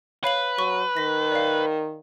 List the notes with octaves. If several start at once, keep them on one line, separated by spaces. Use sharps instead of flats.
B4 C#5 F5 F#7
F#3 C#6
D#3 A#6 B6
D5 F5